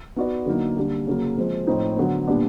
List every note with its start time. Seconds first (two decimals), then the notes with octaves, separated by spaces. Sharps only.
0.16 B3 D#4 F#4 B4 D5
0.46 D3 F#3 A#3 D#4
0.77 D3 G3 A#3 D4
1.07 C#3 F#3 A#3
1.37 F3 G#3 C4
1.67 A2 F3 A3 C4 D#4
1.97 D3 F#3 B3
2.27 A#2 G3 B3 D4